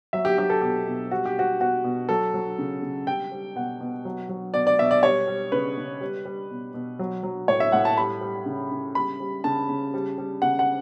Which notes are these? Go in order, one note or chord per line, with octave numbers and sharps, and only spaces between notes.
F#3 E5
G4
F#3 G4
A4
B2 G4
B2
G3 F#4
G4
G3 F#4
B2 F#4
B2
F#3 A4
F#3
C#3
C#3
G3 G5
G3
B2 F#5
B2
F#3
F#3
B2 D5
D5
B2 E5
D5
G3 C#5
G3
C#3 B4
C#3
G3
G3
B2
B2
F#3
F#3
A2 C#5
E5
A2 F#5
A5
G3 B5
G3
C#3
C#3
G3 B5
G3
C#3 A5
C#3
G3
G3
C#3 F#5
F#5